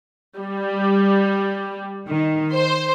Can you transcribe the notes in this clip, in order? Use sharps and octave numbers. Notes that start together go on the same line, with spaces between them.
G3
D#3
C5